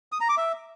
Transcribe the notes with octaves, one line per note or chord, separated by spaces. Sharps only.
D#6
A#5
D6
E5